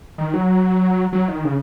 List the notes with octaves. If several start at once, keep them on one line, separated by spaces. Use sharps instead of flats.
D#3
F#3
F#3
D#3
C#3